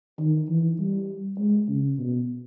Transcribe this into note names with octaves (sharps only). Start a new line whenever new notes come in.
D#3
E3
G3
G#3
C#3
B2